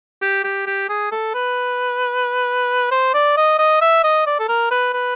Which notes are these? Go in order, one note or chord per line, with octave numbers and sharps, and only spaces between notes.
G4
G4
G4
G#4
A4
B4
C5
D5
D#5
D#5
E5
D#5
D5
A4
A#4
B4
B4